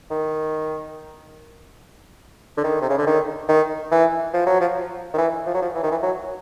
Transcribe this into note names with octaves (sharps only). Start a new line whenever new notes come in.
D#3
D3
D#3
C3
C#3
D3
D#3
D#3
E3
F3
F#3
F3
D#3
E3
F3
F#3
F3
E3
D#3
E3
F#3